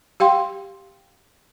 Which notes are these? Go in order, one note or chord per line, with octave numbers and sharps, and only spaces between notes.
G4 F5 G5 C6